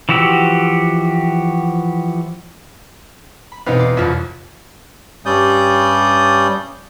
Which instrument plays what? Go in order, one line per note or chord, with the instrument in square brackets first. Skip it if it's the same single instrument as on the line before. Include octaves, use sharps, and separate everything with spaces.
[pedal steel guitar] E3 F3 F#4 G4 E6
[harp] B5
[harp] E1 B2 F5 [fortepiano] B3 C4 D#4
[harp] D5 C7
[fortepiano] C2 F3 [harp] F2 C#5 E5
[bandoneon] G2 G3 C#4 D5 D#6 G6